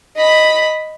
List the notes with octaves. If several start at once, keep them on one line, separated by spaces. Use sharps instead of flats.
D#5 B5